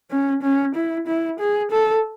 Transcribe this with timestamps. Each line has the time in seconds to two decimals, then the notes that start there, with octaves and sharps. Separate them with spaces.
0.11 C#4
0.43 C#4
0.75 E4
1.07 E4
1.40 G#4
1.71 A4